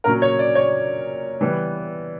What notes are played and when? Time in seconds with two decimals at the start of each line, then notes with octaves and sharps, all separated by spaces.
0.04 A#2 F#3 C#4 A#4
0.22 C#5
0.39 D5
0.55 C#5
1.41 E3 G3 B3